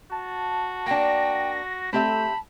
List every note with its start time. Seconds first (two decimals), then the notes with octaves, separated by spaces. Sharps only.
0.11 F#4 A5
0.86 A#3 D4 G5 A#6
1.93 A3 C4 G4 E5 A5 B5